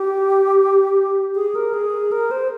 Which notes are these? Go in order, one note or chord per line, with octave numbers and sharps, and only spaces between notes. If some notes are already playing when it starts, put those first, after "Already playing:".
Already playing: G4
G#4
A#4
G#4
A#4
C5